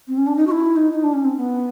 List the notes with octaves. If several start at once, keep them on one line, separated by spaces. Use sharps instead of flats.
C4
C#4
D4
D#4
F#4
E4
D#4
D#4
D4
C#4
C4
C4
B3